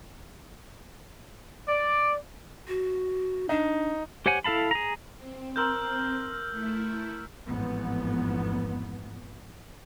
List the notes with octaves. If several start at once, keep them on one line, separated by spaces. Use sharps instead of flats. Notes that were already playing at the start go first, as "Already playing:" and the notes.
D5
F#4
D4 D#4
G4 C5 C#5 F#5 G#5
E4 A4 F5 A5 B5
G#4 A#5
C4
A#4 A5 C6 E6 F6 G6
A3 E4
A1 F2 G#2 B3